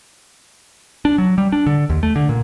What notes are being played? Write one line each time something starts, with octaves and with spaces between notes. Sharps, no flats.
D4
F#3
G3
D4
D3
D#2
A3
D3
A#2